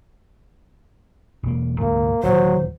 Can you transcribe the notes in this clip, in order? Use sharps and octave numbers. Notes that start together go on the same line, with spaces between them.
E1 A#3
D2 G#2 C3 A#3
D1 D#2 E3 F#3 C5